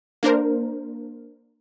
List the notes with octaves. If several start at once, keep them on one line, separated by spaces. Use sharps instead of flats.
A#3 D4 A#4 C5